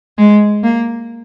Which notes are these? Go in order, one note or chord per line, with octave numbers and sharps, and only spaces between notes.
G#3
A#3